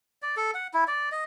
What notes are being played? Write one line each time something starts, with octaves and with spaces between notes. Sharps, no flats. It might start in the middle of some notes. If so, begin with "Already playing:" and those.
D5
A4
F#5
E4
D5
D#5